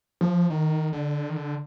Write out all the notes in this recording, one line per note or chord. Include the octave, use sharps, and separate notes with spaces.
F3
D#3
D3
D#3
D3